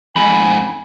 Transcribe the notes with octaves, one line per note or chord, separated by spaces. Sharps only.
F2 G#2 G#5 B5